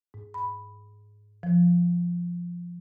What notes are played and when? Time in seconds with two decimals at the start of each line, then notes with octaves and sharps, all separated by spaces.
0.14 G#2
0.34 B5
1.43 F3